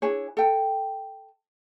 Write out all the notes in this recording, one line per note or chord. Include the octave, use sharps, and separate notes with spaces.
D4 E4 G#4 C#5
A4 G5